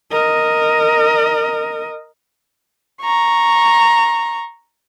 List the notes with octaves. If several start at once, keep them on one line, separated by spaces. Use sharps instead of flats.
A#4 D#5
A#5 C#6